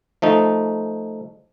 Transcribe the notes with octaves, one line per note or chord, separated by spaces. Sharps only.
F3 A3 D#4